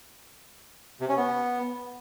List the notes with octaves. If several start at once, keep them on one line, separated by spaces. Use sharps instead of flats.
C3
C#4
B3